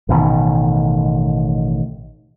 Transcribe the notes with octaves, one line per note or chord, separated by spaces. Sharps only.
A1 B2 D3 D#3